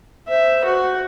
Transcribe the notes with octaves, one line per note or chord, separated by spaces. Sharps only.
C5 E5
F#4